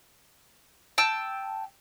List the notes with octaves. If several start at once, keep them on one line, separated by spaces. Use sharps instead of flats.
G5 A5 E6